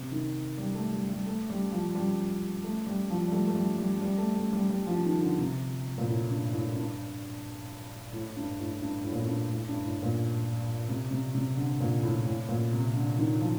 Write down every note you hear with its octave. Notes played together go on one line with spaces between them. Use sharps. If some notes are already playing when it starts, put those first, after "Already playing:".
Already playing: C3
D#3
G3
A3
G3
G3
A3
G3
F3
G3
A3
G3
F3
G3
A3
A3
G3
G3
G3
A3
A3
G3
G3
F3
D#3
D3
C3
A#2
A2
G2
A2
G2
A2
G2
A2
G2
A2
A#2
A2
G2
A2
G2
A2
A#2
C3
C3
C3
D3
A#2
A2
A2
A#2
C3
D3
D#3
F3